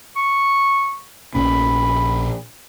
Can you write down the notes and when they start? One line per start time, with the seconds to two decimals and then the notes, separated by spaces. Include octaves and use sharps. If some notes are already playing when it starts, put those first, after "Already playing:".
0.16 C#6
1.35 A#1 A#2 C#4 B5